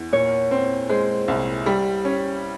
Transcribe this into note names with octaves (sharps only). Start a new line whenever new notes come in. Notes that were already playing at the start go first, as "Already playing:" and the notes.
Already playing: E2
A#2 C#5
C4
G#3 C5
C2
G3
C#4